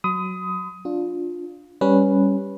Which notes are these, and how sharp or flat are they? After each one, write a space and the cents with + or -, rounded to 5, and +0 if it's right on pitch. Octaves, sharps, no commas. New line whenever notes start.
F#3 +0 B5 +45 D#6 +15
D4 +0 F4 +15
G3 +0 C#4 +0 B4 -10